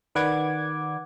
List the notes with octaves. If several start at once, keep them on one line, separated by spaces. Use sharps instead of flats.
D#3 B4 D5 F#5 D6 G#6